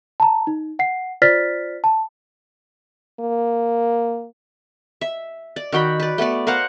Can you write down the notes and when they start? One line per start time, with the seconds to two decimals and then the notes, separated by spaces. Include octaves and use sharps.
0.20 A5 A#5
0.47 D#4
0.79 F#5 C7
1.22 F4 C5 D5 F6 A6 B6
1.84 A5
3.20 A#3
5.01 E5
5.56 D5
5.72 D#3 F#4 G5 B5
6.00 B4 D5
6.18 A3 B3 B4 D5
6.47 A#4 C5 F5 F#5